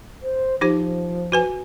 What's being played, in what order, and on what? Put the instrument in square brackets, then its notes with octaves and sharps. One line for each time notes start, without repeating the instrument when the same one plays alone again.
[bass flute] C5
[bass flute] F3 [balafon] D#4 G4 C5
[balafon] F#4 B4 G#5